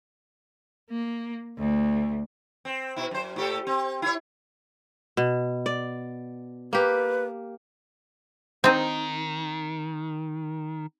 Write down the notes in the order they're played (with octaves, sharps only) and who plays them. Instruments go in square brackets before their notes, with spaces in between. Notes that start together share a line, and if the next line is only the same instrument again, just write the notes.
[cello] A#3
D2
[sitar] C4
B2 E4
F#2 C5
A2 G4 A4
C4
E4 C#5
[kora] B2
D5
[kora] A#3 G4 [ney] B4
[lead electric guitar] D#3 [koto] C4 D#4